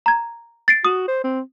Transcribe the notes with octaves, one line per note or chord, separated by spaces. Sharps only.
A#5 G#6
A6 C7 D7
F#4 D#6
C5
C4